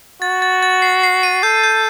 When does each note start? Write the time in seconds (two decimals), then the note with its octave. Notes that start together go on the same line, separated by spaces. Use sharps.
0.22 F#4 A6
0.42 A6
0.63 A6
0.82 C7
1.03 C7
1.23 D#7
1.43 A4 G6
1.64 G6